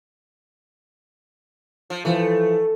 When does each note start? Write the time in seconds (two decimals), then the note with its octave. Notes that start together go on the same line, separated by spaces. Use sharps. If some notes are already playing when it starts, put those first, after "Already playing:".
1.90 F3
2.05 E3 F3 A3